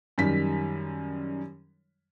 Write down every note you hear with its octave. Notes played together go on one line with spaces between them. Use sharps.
F#2 D#3 G3 B6